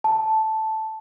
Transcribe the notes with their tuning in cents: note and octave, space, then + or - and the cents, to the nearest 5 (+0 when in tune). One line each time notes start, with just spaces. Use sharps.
A5 -5